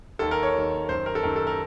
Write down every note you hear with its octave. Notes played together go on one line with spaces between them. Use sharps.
D#2 D#3 A4
A#4
C#5
D#2 D#3
F#2 D#3 C5
A#4
A4
F#2 D#3 A#4
A4
A#4